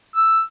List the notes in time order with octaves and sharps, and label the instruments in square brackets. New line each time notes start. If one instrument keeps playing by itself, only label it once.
[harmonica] E6